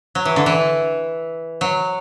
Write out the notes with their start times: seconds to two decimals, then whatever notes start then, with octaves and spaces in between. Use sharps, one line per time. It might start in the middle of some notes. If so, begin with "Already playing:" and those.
0.15 F#3
0.25 E3
0.36 D3
0.46 E3
1.61 F#3